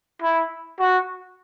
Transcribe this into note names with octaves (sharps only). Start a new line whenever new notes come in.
E4
F#4